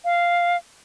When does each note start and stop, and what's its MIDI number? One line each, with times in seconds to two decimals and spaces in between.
0.05 0.57 77